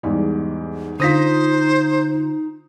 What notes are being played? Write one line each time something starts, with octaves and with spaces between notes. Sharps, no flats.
E2 G#2 G3
D3 D#4 F4 C5 D#6 A#6 B6